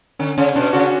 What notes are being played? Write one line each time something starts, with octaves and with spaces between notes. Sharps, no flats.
D3 C#4
C#3 C#4
B2 D4
C#3 F#4